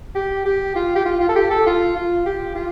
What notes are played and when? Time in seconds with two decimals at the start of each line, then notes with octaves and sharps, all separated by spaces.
0.15 G4
0.45 G4
0.76 F4
0.95 G4
1.05 F4
1.20 F4
1.28 A4
1.35 G4
1.50 A4
1.66 F4
1.96 F4
2.26 G4
2.55 F4